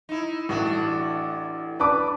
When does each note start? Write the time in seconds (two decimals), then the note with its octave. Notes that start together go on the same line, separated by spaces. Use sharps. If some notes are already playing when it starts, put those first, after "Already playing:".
0.09 D#4 E4
0.49 A1 A3 D4 F#4
1.80 D4 B4 A5 B5 D6